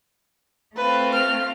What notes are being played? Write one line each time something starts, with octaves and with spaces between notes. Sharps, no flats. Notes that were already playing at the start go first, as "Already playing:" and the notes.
A3 C4 F4 B4
F6